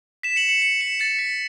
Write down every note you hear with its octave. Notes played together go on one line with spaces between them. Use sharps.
B6 E7
C#7 F#7
C#7 F#7
C#7 F#7
B6 E7
A6 C#7
B6